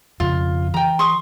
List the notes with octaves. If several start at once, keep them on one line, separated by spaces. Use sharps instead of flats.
F2 C#3 F4
E3 G5 A#5
C6 C#6 D#6